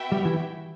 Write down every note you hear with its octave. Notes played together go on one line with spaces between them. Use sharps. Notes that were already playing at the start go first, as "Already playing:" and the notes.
Already playing: B3 F#4 B4 E5 G5
G3
E3